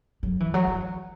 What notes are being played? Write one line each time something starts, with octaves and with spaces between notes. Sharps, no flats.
F#3
E3
F#3
E3